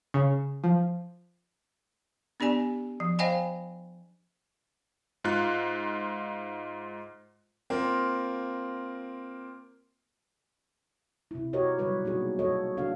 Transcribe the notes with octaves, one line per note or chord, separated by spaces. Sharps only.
C#3
F3
B3 D4 G4 D5 G#5
F3
C5 D#5 F5 G5 G#5 B5
G#2 F4 F#6
A#3 C4 F4 A#4
C3 E4
F#4 G4 A#4 C#5 D#5
D3 F#3 G3 B4 C#5
B2 A#3 D#4 F#4 G#4
F#4 A4 C#5 D#5
D3 A#3 D4 F#4 A4 F5